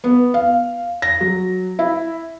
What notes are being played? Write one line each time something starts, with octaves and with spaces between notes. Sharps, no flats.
B3
F5
A#6
F#3
E4